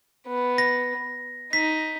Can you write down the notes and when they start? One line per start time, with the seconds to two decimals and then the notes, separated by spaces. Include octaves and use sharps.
0.27 B3
0.58 A#6
1.53 D#4 B6